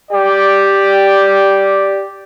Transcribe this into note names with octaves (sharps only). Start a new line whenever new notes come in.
G4 D5